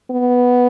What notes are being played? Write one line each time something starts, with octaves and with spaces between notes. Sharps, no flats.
B3